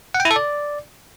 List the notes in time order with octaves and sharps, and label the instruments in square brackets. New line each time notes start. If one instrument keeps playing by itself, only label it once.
[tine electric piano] F#5
G5
E4
A4
D5